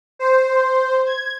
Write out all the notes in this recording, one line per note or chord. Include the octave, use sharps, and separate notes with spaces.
C5
G#6